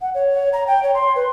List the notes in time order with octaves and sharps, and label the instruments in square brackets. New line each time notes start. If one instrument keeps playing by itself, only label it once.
[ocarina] F#5
C#5
A#5
G5
C#5
C6
B4